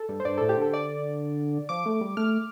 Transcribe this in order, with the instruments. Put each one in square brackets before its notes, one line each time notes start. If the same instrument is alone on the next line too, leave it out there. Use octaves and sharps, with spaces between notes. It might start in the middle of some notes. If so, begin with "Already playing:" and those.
Already playing: [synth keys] A4
[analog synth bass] G2
[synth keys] C5
[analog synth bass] G2 [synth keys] D5
[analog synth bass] A2 [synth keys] A4
[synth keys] G4
[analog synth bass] D3 [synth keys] A4
[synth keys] D5
[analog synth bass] F3 [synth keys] D6
[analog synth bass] A3
G3
[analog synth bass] A3 [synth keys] F6